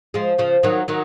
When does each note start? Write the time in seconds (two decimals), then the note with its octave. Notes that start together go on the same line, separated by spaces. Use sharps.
0.14 F3 G#3
0.38 C#3 F3
0.63 D#3 F#3
0.88 D#3 F#3